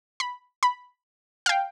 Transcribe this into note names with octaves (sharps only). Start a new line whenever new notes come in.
B5
B5
F5
G5